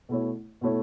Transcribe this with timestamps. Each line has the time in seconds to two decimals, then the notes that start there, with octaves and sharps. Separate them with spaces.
0.09 B2 A3 E4 C#5
0.61 B2 A3 E4 C#5